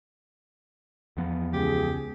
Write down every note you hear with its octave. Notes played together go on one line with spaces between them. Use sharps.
E2 F3 B3
C#2 G4 G#4